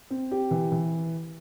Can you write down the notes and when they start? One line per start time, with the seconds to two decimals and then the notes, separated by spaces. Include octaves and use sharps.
0.10 C4
0.31 G4
0.51 E3
0.72 E3